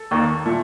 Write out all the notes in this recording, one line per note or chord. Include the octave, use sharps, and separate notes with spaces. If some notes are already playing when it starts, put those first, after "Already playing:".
Already playing: A4
D#2 D#3 A#3
A#2 A3